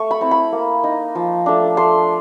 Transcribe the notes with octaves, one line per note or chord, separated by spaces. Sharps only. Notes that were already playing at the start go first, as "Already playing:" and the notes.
Already playing: A3 C#6
B5
C4 E4
B5
A#3
D#4
F3
A3 D4
A3 C6